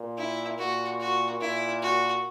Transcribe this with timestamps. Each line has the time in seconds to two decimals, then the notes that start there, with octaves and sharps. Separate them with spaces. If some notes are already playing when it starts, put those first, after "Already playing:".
Already playing: A#2
0.17 E4
0.58 A#2 F#4
1.00 F#4
1.41 A#2 E4
1.82 F#4